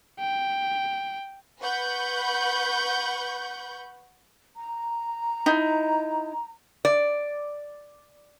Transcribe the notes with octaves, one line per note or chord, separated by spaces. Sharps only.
G5
B4 F#5 B5 C#6 G6
A#5
D#4 E4
D5